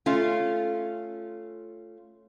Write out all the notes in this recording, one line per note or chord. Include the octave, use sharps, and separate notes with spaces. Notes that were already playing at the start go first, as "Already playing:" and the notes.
A3 C#4 F4